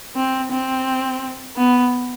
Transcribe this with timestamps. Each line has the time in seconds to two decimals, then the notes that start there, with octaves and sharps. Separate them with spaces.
0.16 C4
0.52 C4
1.57 B3